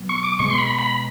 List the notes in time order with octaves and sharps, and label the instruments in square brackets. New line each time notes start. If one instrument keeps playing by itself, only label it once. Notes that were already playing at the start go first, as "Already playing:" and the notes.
Already playing: [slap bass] B2 F#3 B3
[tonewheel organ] C#6
D6
[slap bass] B2 G#3 B3 [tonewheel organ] C#6
[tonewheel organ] C6
B5
B5